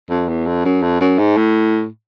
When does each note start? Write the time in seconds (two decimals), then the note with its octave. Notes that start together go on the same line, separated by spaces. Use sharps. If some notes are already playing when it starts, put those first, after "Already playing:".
0.10 F2
0.28 E2
0.46 F2
0.65 F#2
0.82 F2
1.01 F#2
1.19 G#2
1.37 A2